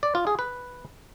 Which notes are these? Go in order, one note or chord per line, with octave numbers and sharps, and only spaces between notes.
D5
F4
G#4
B4